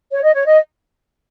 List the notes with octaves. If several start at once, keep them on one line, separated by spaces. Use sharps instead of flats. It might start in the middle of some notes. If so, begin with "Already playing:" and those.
C#5
D#5
C#5
D#5